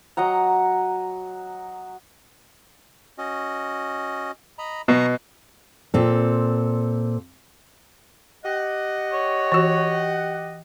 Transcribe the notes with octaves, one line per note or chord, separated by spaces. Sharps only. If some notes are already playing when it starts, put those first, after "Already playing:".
F#3 D#5 F#5 A#5
C#4 F#4 D#5
D#5 A#5 B5
B2 A#5 C#6 D#6
A#2 C4 A4
G4 D#5 F#5
C#5
E3 F#4